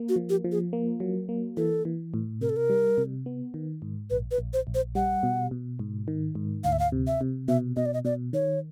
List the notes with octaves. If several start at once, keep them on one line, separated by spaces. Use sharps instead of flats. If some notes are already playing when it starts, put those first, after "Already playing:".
Already playing: A#3
F#4
F3
G4
F3
G#4
A#3
F#3
A#3
E3 A4
E3
A2
C3 A#4
A4
A#4
G3
C3
B3
D#3
G#2
A#1 B4
B4
A#1
C5
A#1
C5
G3 F#5
B2
B2
G#2
D#3
G#2
D2 F5
E5
F5
C3
E5
C3
B2 E5
B2 D#5
D5
D#5
B2 D5
D#3 C#5